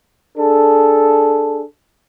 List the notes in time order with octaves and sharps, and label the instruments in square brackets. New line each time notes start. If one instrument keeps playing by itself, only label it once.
[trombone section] D4 G#4 A4